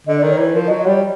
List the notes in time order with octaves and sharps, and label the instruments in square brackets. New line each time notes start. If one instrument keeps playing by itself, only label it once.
[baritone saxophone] D3 [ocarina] D#5
[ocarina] D5
[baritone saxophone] D#3
[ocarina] C#5
[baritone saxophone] E3 [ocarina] B4
[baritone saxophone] F3 [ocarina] A#4
[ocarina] D#5
[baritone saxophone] F#3
[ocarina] D#5
[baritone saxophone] G3 [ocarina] C#5 D5